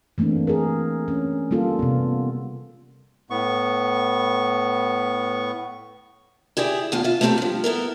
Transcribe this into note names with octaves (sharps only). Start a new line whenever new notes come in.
E3 A3 A#3 C4 D4
G#4 A#4
C#4
G3 A#3 F4 A4
C3 B3
A2 B3 C#6
E4 G4 G#4 D5 E5
E2 A2 F4
F4 E5
A3 B3 C4 G4 A4 A#4
G2 F3
B3 E4 A4 A#4